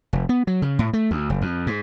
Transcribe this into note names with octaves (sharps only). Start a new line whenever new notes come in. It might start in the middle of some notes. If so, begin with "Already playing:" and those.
F1
B3
F#3
C#3
A2
A3
D2
F#1
F2
G#2